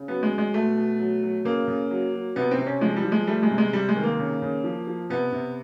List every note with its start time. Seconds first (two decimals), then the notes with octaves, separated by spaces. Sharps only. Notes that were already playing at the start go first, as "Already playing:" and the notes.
Already playing: C#3
0.08 F#3 B3
0.23 G#3
0.31 F#3
0.38 G#3
0.54 B2 A3
0.77 B2
1.00 F#3
1.23 F#3
1.45 C#3 A#3
1.68 C#3
1.91 F#3
2.14 F#3
2.36 C3 B3
2.51 C4
2.59 C3
2.67 C#4
2.81 F3 G#3
2.97 G3
3.04 F3
3.12 G#3
3.27 G3 A3
3.43 G#3
3.51 C3
3.58 G#3
3.73 C3 G3
3.89 G#3
3.96 D#3
4.03 A#3
4.19 C#3
4.42 C#3
4.64 F3
4.87 F3
5.10 C3 B3
5.32 C3